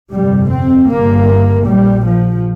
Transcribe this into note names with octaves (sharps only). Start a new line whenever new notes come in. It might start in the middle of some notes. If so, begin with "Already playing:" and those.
G1 F2 C3 G3
C4
G1 G2 A#3
A#1 A#2 G3
F3